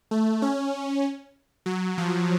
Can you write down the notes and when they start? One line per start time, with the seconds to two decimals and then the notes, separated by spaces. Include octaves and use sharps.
0.11 A3
0.42 C#4
1.66 F#3
1.98 F3